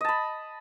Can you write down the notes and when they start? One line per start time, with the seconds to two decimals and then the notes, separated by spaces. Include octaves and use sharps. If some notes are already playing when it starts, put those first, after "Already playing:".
0.01 D#5
0.05 A5
0.09 B5